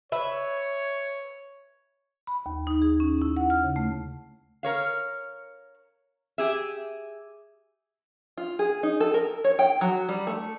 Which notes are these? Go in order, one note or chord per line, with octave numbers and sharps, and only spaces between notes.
B4 C#5 E5
B5
D#2
D#4
G#4
C#4
E4
F#5
F6
C#3
A3
A#4 C#5 F5
G4 G#4 E5
F4
G#4
D#4
A4
A#4
C#5
G5
F#3
G3
A3